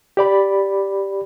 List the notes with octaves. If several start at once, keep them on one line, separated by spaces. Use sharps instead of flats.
G4 D5 B5